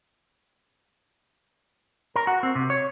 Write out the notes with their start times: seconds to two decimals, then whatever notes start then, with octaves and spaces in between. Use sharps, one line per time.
2.16 A#4
2.27 F#4
2.43 C4
2.55 C3
2.70 C#5